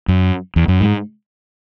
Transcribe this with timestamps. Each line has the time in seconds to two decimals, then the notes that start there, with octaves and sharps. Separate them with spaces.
0.08 F#2
0.56 E2
0.68 F#2
0.81 G#2